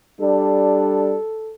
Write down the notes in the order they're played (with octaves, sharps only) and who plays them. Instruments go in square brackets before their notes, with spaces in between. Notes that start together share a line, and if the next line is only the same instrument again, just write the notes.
[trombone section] G3 D4 [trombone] A4